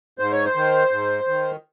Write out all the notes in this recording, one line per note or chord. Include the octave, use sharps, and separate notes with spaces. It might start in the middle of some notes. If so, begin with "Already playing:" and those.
G#2 C5
C#5
C5
D#3
G#2
D#3